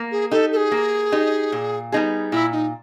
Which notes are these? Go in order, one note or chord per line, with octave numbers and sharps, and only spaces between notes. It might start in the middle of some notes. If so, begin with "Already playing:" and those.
Already playing: A#3
G#4
D#4 G4 A4
A4
G#4
A#3
D#4 G4
A#2
G3 B3 D#4 G#4
A#2 E4
D#4